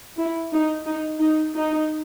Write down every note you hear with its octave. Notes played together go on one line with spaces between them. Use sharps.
E4
D#4
D#4
D#4
D#4